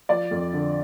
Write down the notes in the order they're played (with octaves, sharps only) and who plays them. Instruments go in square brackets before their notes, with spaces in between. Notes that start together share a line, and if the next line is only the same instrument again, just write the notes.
[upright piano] F3 D5
F2
D3